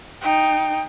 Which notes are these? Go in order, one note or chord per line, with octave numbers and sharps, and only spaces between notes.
D#4 G5